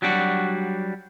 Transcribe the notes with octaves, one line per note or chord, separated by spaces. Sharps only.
F#3 G3 D4 F#4